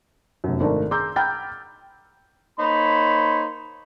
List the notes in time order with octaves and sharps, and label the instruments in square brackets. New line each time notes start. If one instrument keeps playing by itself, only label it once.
[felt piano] F1 F#2
G#1 A3 D4 A#4 D5 A5
G#4 A#5 C6 D6 E6 G6
G5 A#5 B5 F6 G6 A6
[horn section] A#3 D#4 C5 C#5 B5